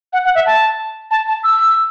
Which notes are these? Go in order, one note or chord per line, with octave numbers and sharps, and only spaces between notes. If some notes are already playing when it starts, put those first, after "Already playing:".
F#5
F#5
E5
A5
A5
A5
E6